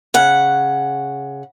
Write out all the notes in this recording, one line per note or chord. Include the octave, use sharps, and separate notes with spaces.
C#3 F#5